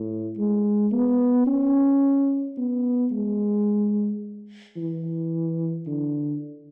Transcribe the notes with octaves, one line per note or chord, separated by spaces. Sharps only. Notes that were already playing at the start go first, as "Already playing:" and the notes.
Already playing: A2
G#3
B3
C#4
B3
G#3
E3
D3